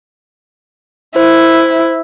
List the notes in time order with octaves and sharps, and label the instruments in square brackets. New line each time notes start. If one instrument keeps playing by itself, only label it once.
[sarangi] E4 [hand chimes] C5